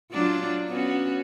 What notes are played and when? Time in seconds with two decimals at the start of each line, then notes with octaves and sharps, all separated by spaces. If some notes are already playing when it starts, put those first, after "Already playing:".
0.11 F#3 D4 F4
0.69 B3 C#4 F#4